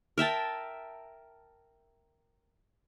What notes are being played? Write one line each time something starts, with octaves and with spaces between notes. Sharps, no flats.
A#4 E5 G5 A5